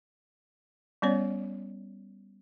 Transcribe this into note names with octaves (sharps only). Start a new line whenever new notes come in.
G3 B3 C#4 C#5 D5